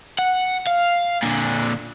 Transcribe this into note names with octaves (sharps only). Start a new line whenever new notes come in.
F#5
F5
A#2 D3